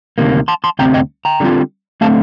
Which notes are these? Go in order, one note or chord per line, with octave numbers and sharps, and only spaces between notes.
D2 C3 D#3 A#3
A5 C6
A5 C6
D2 C3 G3 C4 G5 A#5
D#5 G5
G5 A#5
D3 G3 C4 F4
D3 A3 C4 F5 A5